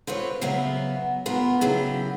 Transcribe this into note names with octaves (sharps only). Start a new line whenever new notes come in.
C4 F4 B4 C#5
C#3 F#3 B3 E5 F5
B3 F4 A#4
C#3 F#3 E4 G4